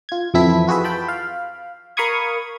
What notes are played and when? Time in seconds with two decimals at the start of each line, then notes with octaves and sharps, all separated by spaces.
0.09 F4 G#6
0.34 F2 E3 C4 E4 A4 B6
0.67 F4 F#4 G#4 B4 E5
0.84 F4 G5 A5 B5
1.08 F5
1.97 A#4 F5 B5 C#6 D#6 G#6